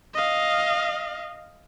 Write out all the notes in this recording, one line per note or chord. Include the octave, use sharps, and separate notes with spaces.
D#5 F5